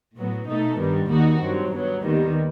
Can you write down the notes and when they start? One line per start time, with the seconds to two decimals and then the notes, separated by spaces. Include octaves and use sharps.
0.16 A2 F#3 B3
0.47 B2 A3 D#4 A4
0.79 G2 D#3 G3 B3
1.10 D#2 D#3 G3 D#4 F#4
1.40 G2 F#3 C4
1.71 G2 F#3 B3
2.03 D#2 D#3 G3 B3